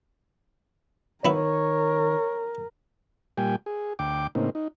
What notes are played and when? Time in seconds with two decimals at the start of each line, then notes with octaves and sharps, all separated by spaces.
1.25 D#3 B3 E4 A#4 B4 C#5
3.38 A#2 G3 G5 G#5
3.66 G#4
3.99 D2 G5 D6
4.35 A2 C#3 A#3 C4 D#4
4.55 D#4